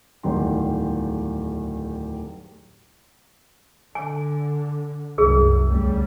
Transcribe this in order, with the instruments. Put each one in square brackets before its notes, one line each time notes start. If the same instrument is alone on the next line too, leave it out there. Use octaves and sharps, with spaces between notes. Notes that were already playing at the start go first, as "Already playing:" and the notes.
[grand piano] D1 E2 D#3 G3 C6
[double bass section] D3 [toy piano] G#5
[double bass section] C2 F#2 [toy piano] G#4 E6
[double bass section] D2 C#3 G3